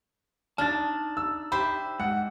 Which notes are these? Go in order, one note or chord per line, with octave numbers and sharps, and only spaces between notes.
D4 D#4 A5 F6 A6
E6
G4 C5 E5 B5
G#2 F#5